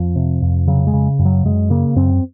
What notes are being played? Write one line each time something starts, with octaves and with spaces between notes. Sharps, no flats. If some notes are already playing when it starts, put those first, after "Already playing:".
Already playing: F2 F3
C3
F2
C#3 F#3
G#3
C#3
F#2
F#3
F#2 G#3
C#3 A#3
F#2 C4